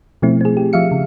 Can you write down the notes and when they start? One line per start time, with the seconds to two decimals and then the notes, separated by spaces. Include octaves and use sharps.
0.22 B2 F3 A3 C4 E4
0.41 C4 G#4
0.57 G4
0.73 F3 E5 F5 C#7
0.92 C#3